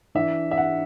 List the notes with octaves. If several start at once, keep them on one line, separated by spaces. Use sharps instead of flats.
E3 D4 E5
E5
F#5